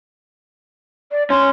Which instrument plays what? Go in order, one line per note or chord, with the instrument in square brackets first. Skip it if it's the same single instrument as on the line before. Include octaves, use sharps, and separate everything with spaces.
[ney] D5
[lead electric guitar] C#4 [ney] C6